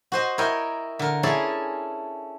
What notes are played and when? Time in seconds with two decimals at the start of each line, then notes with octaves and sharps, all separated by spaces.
0.12 F#4 C5 D#5
0.38 E4 A#4 C#5 D#5 G5
0.99 D3 A#4
1.23 C#4 E4 G#4 A4 D5